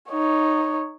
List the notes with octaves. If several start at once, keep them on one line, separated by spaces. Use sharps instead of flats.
D#4 C#5